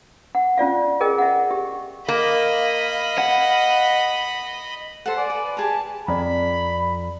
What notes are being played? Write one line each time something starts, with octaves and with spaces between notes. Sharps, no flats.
F#5
C#4 F4 D5 F5
G#4 A#4 D#5 G5
E5 F#5
G4
A#3 D#5 F5 B5
F#5
A4 C5 F#5
D5 G#5
B4
G4 G#4 A#4 A5
F2 D5 A#5 B5